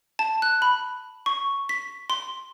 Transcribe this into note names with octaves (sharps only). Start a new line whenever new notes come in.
A5
F#6
B5
C#6
B6
C6